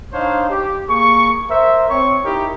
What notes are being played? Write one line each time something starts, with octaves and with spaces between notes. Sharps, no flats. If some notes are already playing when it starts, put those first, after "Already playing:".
D4 D#4 C5 C#5 F5
G4
A#3 G#4 C#6
A#4 C5 E5
C4 C#5 C#6
D#4 E4 G4 A#4